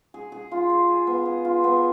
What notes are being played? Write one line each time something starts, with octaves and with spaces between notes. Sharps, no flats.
G#4
G#4
F4
G#4
G#4
B3
G#4
F4
B3